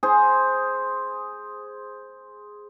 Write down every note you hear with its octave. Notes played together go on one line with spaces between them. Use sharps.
G#4 C5